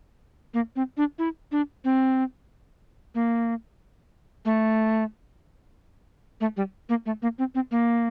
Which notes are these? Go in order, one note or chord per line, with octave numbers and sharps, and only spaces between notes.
A#3
C4
D4
E4
D4
C4
A#3
A3
A3
G3
A#3
A3
A#3
C4
C4
A#3